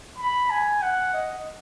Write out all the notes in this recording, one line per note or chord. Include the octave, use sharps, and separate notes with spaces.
B5
G#5
F#5
D#5